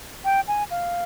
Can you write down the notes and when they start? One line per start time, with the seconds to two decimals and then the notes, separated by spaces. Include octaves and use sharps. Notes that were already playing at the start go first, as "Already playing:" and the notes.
0.25 G5
0.48 G#5
0.71 F5